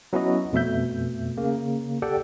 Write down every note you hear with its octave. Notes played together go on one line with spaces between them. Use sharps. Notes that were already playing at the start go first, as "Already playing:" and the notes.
F#3 B3 C#4 E4 F#4 D#5
F2 B2 A3 E5 G6
C#3 A#3
G4 A4 D5 F#5 G5